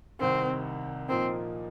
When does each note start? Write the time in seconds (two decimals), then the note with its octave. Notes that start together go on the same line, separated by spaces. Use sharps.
0.20 C2 C3 D#3 C4
1.08 A#2 F3 A#3 C4 D#4